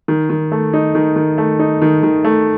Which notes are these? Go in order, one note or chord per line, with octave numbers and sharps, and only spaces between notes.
D#3
D#3
A3
D#4
D#3
D#3
A3
D#4
D#3
D#3
A3